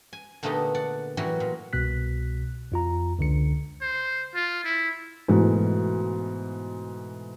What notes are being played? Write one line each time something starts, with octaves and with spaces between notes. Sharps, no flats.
G#5
A#2 D3 A3 B3 D#4 G4
D5 F#5
A2 E3 F#3 G3 F#4
A#2
C2 B2 F#6 B6
F2 F4 A#5
C#2 D3 C#7
C5
F4
E4
G#2 B2 E3 A3